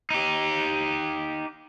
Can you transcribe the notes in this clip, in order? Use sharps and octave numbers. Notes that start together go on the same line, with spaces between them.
D#4 G4